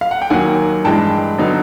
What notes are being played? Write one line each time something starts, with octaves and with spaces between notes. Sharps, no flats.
F5
F#5
G5
D#2 D#3 F#3 A#3 F#5 G#5
G2 E3 G#3 G5 A5
D3 F#3 B3 D#4